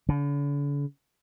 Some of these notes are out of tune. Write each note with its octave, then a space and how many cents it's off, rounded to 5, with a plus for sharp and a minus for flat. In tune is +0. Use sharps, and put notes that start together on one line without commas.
D3 -45